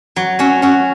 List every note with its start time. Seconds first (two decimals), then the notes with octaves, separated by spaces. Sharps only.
0.16 F#3
0.39 C#4 F#4
0.62 C#4 F#4